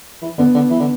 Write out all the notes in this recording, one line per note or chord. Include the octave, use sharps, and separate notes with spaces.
E3
D3 B3
D3
E3
D3